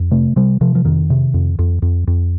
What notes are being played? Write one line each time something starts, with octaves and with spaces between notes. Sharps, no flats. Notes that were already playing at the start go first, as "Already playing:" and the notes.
Already playing: F2
C3 A3
C3 G3
C3 F3
F3
F2 D#3
C3
F2
F2
F2
F2